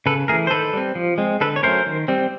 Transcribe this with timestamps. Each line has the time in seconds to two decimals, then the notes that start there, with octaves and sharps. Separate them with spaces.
0.06 C#3 A4 B4
0.28 A3 G#4 A#4
0.32 E3
0.47 C5
0.50 D#3 A4 B4
0.73 G3 C4
0.95 F3
1.18 G#3 C4
1.41 D3 A4 B4
1.56 C#5
1.63 F#3 A3 C#4 A#4 C5
1.86 D#3
2.08 G3 C4